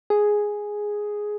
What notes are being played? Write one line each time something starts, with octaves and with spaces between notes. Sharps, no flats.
G#4